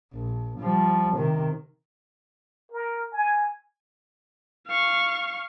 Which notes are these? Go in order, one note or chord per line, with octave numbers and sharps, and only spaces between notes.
A#1
F3 G3
C3 D#3
A#4
G#5
F5 C#6